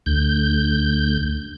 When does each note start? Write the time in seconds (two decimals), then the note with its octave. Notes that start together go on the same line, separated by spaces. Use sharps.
0.06 D2 G6